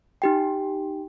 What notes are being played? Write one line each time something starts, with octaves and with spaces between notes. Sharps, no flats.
D#4 G4 G5